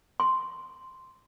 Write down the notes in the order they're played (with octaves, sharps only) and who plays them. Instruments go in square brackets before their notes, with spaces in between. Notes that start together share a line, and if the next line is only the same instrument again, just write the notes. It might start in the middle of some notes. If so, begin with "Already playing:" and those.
[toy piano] C6